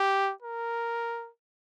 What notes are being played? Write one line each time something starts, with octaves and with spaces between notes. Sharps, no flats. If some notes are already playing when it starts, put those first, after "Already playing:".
Already playing: G4
A#4